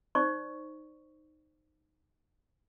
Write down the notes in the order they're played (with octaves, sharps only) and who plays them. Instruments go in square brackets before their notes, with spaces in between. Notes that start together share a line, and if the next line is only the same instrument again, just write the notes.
[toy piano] D#4 C5 D5 C#6